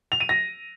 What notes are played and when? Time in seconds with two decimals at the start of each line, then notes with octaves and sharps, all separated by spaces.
0.12 F7
0.20 D#7
0.29 A#6